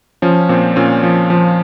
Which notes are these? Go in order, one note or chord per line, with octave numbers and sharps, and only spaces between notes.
F3 C#4
A#2 C4
A#2 C#4
F3
F3